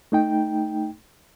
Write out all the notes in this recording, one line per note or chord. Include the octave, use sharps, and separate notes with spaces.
A3 D#4 G5